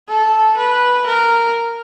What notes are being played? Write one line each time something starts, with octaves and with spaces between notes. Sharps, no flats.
A4
B4
A#4